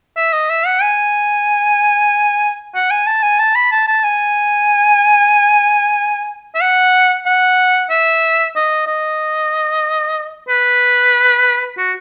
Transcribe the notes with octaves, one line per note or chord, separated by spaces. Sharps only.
E5
D#5
E5
F#5
G#5
F#5
G#5
A5
G#5
A5
B5
A5
A5
G#5
E5
F#5
F#5
E5
D#5
D#5
B4
F#4